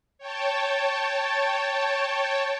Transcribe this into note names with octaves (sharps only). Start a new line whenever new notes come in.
C#5 G5 A5